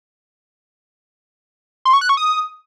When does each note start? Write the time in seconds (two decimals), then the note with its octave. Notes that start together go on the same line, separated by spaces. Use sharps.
1.85 C6
1.93 C#6
2.01 F#6
2.09 C#6
2.17 D#6